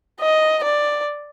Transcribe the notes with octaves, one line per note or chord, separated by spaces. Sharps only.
D#5
D5